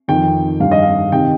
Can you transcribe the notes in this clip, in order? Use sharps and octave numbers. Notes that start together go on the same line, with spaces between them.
F2 D#3 G5
G2 D#3 F5
D#5
F5
C3 D#3 G5